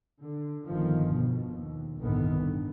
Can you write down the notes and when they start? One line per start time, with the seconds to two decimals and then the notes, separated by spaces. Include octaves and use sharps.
0.20 D3
0.66 G1 F2 D#3 F3
1.14 B2
1.52 D#2
2.00 G1 C2 A2 D#3 B3
2.36 G2